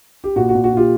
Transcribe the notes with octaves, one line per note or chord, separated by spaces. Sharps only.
G4
A#2 F#4
F#4
A#2
F#4
A#2 F4 G4